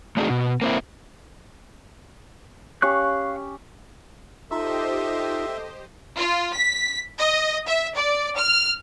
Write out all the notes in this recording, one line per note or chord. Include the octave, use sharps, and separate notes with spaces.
A3 C4 D4 D#4 F#4 G#4
B2
A#3 C4 E4
C#4 G4 F5 C#6 F#6
D#4 F4 G4 A4 C5 D#5 E5
F4
B6
D#5
E5
D5
F6